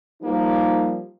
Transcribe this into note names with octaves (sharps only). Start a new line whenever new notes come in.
F3 G3 A#3 D#4